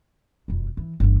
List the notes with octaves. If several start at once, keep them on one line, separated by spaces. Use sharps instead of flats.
E1 F2
E3
G1 E3